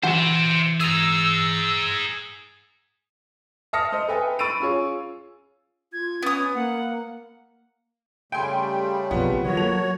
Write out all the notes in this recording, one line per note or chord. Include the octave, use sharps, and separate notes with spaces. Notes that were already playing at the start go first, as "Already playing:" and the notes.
E3 F#4 C5 E5 F#5
G#4 A#5 E6
E5 A5 D#6 F6 A#6 C#7
C5 D#5
A4 B4 E5 G5 G#5
B5 C#6 E6 A6 D7 D#7
C#4 F4 G#4 C#5
F4 G#6
B3 C#4 D#6
A#3 F#5
C#3 G3 A3 G5 G#5 C6
B1 C3 F3 B3
D#3 G3 F4 F#4 C#5
F#3 A#3 A4 F7